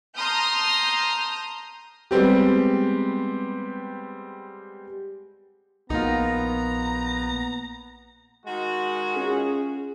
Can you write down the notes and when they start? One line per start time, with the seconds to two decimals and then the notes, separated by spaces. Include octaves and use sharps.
0.16 A5 A#5 C6 D#6 F6 G6
2.11 G3 G#3 B3 C4 G4
5.90 A#1 A#3 B3 D#4 F4 A#5
8.46 D#3 G#3 F#4
9.16 C#4 F4 G#4